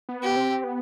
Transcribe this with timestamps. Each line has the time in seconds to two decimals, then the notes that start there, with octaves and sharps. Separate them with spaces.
0.09 B3
0.23 G4
0.36 C4
0.64 B3